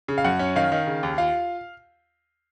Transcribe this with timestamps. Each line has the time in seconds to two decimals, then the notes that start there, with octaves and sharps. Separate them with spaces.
0.08 C#3
0.18 F5
0.24 F#2 F#5
0.39 C#4
0.56 D#3 F5
0.72 D#3
0.87 C#3
1.03 D#2
1.18 F4 F5